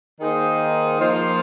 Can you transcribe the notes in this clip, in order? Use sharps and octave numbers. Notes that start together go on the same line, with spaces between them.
D#3 A#3 D#4 G#4 C5
F3 A#3 F4 C5